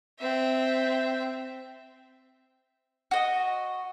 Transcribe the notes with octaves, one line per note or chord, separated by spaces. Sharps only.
C4 E5
F#4 D#5